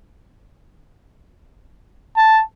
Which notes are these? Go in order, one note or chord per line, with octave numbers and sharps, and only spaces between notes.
A5